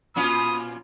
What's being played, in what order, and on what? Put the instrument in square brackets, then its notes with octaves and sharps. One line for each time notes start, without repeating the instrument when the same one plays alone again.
[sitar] A#2 C#4 F4 [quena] B5 [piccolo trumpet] D#6